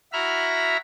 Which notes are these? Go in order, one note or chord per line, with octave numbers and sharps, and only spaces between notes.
E4 F#4 E5 A#5 B5 F6